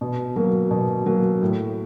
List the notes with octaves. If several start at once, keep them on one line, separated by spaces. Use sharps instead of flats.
B2
F#3 A#3
B2
F#3 A#3
A2